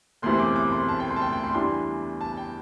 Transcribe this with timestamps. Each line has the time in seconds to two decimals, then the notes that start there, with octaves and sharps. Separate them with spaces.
0.22 E1 D2 C3 E3 C4 C6
0.39 D6
0.56 D6
0.72 C6
0.89 A5
1.00 G5
1.11 C6
1.16 A5
1.21 G5
1.33 G5
1.44 C6
1.55 E2 E3 G3 D4 C6
2.21 A5
2.37 G5